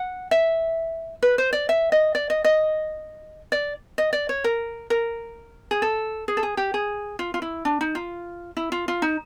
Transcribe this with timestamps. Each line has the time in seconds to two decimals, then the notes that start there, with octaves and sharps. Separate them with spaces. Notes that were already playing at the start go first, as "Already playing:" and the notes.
Already playing: F#5
0.31 E5
1.22 B4
1.38 C5
1.53 D5
1.69 E5
1.92 D#5
2.15 D5
2.30 D#5
2.44 D#5
3.52 D5
3.98 D#5
4.13 D5
4.29 C#5
4.44 A#4
4.90 A#4
5.71 G#4
5.82 A4
6.28 G#4
6.37 A4
6.43 G#4
6.57 G4
6.74 G#4
7.19 F4
7.34 F4
7.42 E4
7.65 D4
7.81 D#4
7.95 F4
8.57 E4
8.72 F4
8.88 F4
9.02 D#4